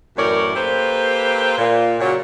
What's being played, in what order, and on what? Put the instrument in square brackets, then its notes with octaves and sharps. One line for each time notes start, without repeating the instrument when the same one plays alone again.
[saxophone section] F#2 A2 E3 A#4 C#5 D5
A#3 G4 A4 B4 C5
A#2
A#2 C#3 F#3